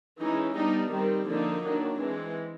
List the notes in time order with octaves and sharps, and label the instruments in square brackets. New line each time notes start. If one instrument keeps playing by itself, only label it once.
[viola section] E3 G#3 C#4 D#4
G3 B3 D4 D#4
D#3 G3 C4 D#4
D3 F3 A#3 D4 D#4
D#3 F#3 A#3 D4
E3 G#3 C4